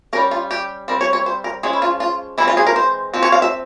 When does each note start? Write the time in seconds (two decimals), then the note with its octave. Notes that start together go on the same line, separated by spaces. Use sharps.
0.13 G3 C#4 A#4
0.31 F4
0.51 G4
0.88 G3 C4 A#4
1.01 C#5
1.13 C#5
1.26 C5
1.44 A#4
1.63 F3 G#3 C#4 G#4
1.73 E4
1.82 F4
2.00 F4
2.38 E3 G#3 C4 E4
2.48 F4
2.57 G#4
2.67 A#4
2.76 C5
3.14 F3 C4
3.23 C#5
3.32 F5
3.42 E5